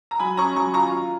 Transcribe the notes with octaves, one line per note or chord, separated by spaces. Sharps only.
A#5
F#3 G#5 B5
C#4 A#5 C#6
F#3 A#5 C#6
F4 A#5 C#6
F4